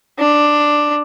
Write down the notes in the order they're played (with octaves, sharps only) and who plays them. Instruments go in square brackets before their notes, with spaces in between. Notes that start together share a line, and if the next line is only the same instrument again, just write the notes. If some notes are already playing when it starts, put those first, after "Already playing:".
[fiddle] D4